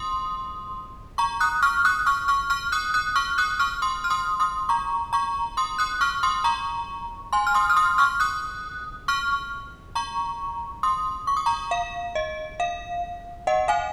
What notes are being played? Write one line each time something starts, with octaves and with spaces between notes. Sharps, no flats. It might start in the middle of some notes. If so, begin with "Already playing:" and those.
Already playing: C6 D#6
A#5 C#6
D#6 F#6
C#6 F6
D#6 F#6
C#6 F6
C#6 F6
C#6 F6
D#6 F#6
D#6 F#6
C#6 F6
D#6 F#6
C#6 F6
C6 D#6
F6
C6 D#6
C6 D#6
A#5 C#6
A#5 C#6
C6 D#6
D#6 F#6
C#6 F6
C6 D#6
A#5 C#6
G#5 C6
F6
C6 D#6
F6
C6 D#6
C#6 F6
D#6 F#6
C#6 F6
A#5 C#6
C6 D#6
C#6
D#6
A#5 C#6
F5
D#5
F5
D#5 F#5
F5 G#5